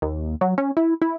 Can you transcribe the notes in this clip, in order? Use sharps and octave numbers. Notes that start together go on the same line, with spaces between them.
D#2
F#3
C#4
E4
E4